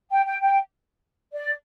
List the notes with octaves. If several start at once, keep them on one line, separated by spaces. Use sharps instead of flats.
G5
G5
G5
D5